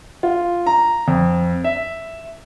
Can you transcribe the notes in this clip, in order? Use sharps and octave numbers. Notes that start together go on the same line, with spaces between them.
F4
A#5
F2
E5